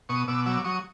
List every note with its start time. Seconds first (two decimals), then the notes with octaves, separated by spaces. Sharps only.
0.09 B2 C#6 D#6
0.28 B2 D6 E6
0.46 F#3 D6 E6
0.64 F#3 C#6 D#6